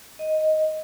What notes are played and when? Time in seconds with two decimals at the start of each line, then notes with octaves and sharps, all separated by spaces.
0.19 D#5